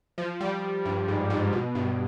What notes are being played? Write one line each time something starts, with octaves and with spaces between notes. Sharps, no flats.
F3
G3
G2
G#2
G#2
B2
G2